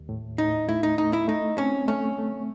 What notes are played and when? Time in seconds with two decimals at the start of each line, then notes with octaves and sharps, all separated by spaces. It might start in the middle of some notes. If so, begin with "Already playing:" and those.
Already playing: D#2
0.09 A2
0.38 A2 D#4
0.69 A3 E4
0.83 D#4
0.98 A3 D#4
1.13 E4
1.28 A3 D#4
1.58 C4 C#4
1.88 A3 C#4
2.18 A3